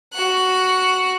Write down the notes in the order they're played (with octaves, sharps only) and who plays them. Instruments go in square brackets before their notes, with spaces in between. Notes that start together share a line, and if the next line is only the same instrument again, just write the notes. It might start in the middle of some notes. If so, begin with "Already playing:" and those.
[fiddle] F#4 F#6